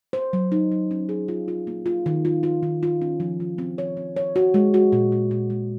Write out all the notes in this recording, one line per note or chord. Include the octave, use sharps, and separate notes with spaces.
C5
F#3
D#4
F#3
C#4
G#4
F4
F4
A#3
F4
D#3
F4
F4
D#3
F4
C#4
F3
F3
C4
C#5
C4
C#5
F#4
G#3
F#4
A#2
A#2
A#2
G#3